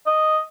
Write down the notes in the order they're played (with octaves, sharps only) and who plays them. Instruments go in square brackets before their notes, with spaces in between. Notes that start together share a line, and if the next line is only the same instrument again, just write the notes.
[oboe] D#5